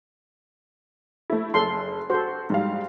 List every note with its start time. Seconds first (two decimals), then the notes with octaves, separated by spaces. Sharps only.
1.30 A3 E4
1.54 F#1 A4 C6
2.10 F#4 A4 C5
2.50 G#2 G3 F5